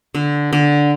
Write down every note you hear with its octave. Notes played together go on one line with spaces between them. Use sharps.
D3
D3